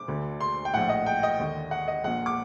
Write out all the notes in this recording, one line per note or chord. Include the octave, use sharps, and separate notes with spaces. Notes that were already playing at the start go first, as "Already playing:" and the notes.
Already playing: D6
D2 D3
C6
G5
A#1 A2 F#5
D#5
G5
D#5
D#2 D3
F#5
D#5
A#1 A#2 F#5
D6